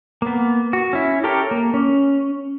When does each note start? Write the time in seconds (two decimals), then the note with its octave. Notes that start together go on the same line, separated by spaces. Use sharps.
0.22 A#3 B3
0.73 F#4
0.93 C#4 E4
1.24 G4 A4 A#4 C#5 G5
1.51 A#3
1.74 C#4